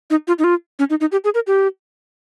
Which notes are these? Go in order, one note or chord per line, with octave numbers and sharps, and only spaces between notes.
D#4
F4
D#4
F4
C#4
D#4
D#4
G4
G#4
A#4
G4